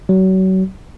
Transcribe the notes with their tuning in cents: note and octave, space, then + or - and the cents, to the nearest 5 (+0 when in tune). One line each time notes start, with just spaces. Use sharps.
F#3 +30